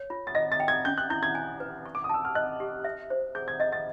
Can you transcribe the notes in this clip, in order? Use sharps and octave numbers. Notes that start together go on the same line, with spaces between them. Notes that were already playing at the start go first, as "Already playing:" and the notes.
Already playing: C#5
F4
A6
D#5 A#6
A6
G5
G#6
C#4 G6
F#6
E4 G6
G#6
G#5
B4
C#6
D6
D#6
A5 E6
F6
D#5 F#6
G4
E5
C5
G#4 G6
G#6
D#5 A6
A6